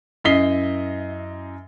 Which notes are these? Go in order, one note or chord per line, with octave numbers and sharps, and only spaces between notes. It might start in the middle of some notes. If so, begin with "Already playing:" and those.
F#2 E4 D#5 B6 C7 G7